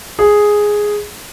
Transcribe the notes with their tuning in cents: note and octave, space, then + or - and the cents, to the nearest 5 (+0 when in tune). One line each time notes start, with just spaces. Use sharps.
G#4 +0